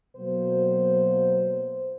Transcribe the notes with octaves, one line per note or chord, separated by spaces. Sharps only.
B2 F#3 A#3 C5